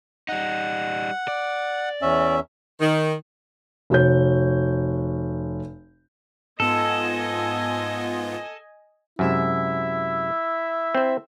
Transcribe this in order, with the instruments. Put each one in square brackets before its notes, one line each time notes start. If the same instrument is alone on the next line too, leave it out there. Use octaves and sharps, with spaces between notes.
[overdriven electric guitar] G3 D#4 [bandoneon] F#5
[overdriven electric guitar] D5
[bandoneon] E2 C#4 E5
[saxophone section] D#3
[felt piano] F1 F#4 C#5 G6
[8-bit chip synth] G#2 B3 F4 [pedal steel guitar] A4 [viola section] D#5 G#5
[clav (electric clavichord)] F#2 C3 G#3 [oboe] E4 [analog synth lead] E5
[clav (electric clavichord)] C4 C5